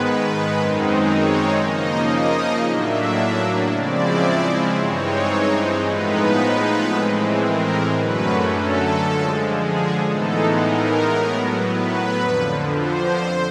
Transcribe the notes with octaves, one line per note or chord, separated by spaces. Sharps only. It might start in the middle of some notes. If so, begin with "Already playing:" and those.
Already playing: G#2 D#3 G#3 B3 B4
F#2 D#3 G#3 C4 D#4
C#5
C#3 F3 A#3 D#4 D#5
D#5
A2 F#3 A#3 D4 E5
C#3 F3 G#3 C4 E4 D5
G2 E3 G#3 C4 D#4 C#5
A2 F3 G#3 B3 D#4 B4
A2 E3 G#3 C4
A#4
F#2 D3 F#3 A3 C#4 B4
A4
D3 F3 G#3
G#4
A2 E3 G#3 B3 D#4 A4
A#4
A2 F#3 B3
B4
F2 D3 F3
C5